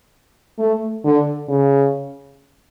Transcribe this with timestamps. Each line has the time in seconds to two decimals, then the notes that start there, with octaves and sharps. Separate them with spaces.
0.59 A3
1.05 D3
1.49 C#3